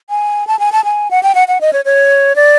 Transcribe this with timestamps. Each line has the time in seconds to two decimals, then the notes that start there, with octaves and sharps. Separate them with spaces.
0.10 G#5
0.47 A5
0.59 G#5
0.72 A5
0.84 G#5
1.11 F#5
1.23 G5
1.35 F#5
1.48 F#5
1.61 D#5
1.73 C#5
1.85 C#5
2.36 D5